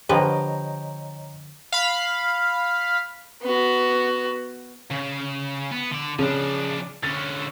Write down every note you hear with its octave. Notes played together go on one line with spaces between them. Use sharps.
D3 F3 G4 B4 C#5 D#5 G5 A#5
F5 B5
B3 F#4
C#3
B3
D3 D5
C#3 F3 D4
D3 C#4 A6